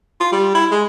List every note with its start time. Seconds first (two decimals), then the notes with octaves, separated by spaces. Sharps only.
0.21 F4
0.32 G3
0.55 E4
0.71 G#3